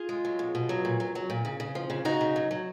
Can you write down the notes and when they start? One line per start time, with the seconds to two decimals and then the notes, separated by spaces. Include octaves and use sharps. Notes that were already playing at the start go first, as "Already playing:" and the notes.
Already playing: F4 G#4
0.09 G#3
0.25 F#3
0.39 B2
0.55 B2
0.69 F#3
0.85 A#2
1.00 F#3
1.15 F#3
1.30 A#2
1.45 C#3
1.60 C#3
1.75 F3
1.90 C#3
2.05 C#3 D#4 F#4
2.21 C#3
2.36 F#3
2.51 F#3